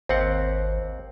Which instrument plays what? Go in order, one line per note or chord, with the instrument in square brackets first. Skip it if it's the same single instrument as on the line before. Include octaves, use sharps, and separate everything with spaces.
[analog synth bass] G#1 [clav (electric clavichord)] D#2 C4 F#5 [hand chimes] C5